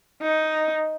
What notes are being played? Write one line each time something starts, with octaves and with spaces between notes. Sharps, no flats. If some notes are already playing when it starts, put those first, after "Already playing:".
D#4